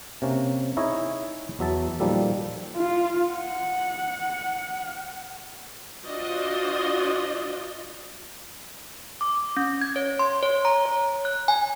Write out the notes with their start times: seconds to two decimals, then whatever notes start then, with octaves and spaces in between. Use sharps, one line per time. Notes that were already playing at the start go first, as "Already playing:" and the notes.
0.22 C3 A#3 C#4
0.77 D#4 E4 G#4 C#5 D#5
1.59 E2 F#3 E5 A5
2.00 A#2 D#3 F3 G3 A#3 A4
2.77 F4
3.31 F#5
6.05 D4 F4 F#4 C5 D5 D#5
9.21 D6
9.57 C#4
9.81 G#6
9.96 C#5
10.19 C6
10.43 C#5
10.65 A#5
10.86 C#5
11.25 F#6
11.48 G#5